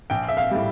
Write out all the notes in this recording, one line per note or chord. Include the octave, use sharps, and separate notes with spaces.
A#1 G5
E5
F5
A2 G3